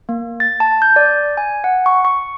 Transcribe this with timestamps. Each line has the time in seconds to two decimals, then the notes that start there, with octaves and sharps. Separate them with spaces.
0.09 A#3
0.40 A6
0.60 A5
0.82 G6
0.96 D5
1.37 G#5
1.64 F#5
1.86 C#6
2.05 C#6